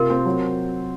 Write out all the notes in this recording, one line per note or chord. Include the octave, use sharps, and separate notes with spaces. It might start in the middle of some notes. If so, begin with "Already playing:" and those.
Already playing: C3 F4 A#4
C4
F#3